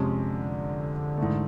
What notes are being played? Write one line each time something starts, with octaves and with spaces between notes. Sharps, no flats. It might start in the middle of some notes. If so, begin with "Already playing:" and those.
Already playing: F2 C3 F3 G#3 C#4
D3
G#2 E3 A3